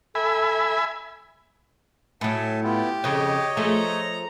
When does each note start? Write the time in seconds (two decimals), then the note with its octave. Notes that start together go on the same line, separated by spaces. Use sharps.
0.15 A4 E5 G#5 B5
2.21 A2 F#3 E5 G#5 A5
2.64 B3 E4 F4 G4
3.04 F2 C#3 C#5 D#5
3.57 F3 A3 G#4 A#5